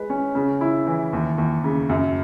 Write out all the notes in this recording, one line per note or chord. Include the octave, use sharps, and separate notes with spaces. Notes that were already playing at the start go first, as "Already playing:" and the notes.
Already playing: G#3 B4
C#4
C#3
E4
E3
D#2
D#2
C#3
F#2